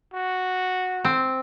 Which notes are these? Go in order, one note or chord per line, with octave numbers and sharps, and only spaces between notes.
F#4
C4